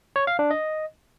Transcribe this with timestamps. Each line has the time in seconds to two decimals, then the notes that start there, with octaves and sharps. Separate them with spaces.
0.16 C#5
0.27 F5
0.39 D4
0.51 D#5